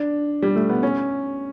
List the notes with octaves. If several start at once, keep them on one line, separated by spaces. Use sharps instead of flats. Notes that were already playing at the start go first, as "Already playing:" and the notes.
Already playing: D4
G3
A3
B3
C#4